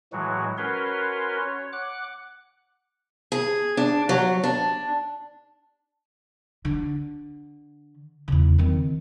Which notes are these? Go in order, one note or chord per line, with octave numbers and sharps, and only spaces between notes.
A2 E3 F#3 G#3 F#4
C#4 F#4 A#4 B4 C#5 C6
C#5
F#5 D6 F#6
G#4
D4
F#3
D4
D3
E2 C#3
D#3 C4